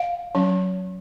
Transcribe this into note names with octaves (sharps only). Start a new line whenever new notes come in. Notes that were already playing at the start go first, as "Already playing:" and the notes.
Already playing: F5
F#3 C#4